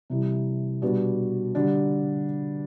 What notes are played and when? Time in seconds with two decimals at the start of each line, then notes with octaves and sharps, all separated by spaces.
0.10 C3 E3 G3
0.82 B2 G3 D4 F#4 B4
1.55 D3 G3 D4